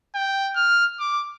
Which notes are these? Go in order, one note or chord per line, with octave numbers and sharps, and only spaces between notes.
G5
F6
D6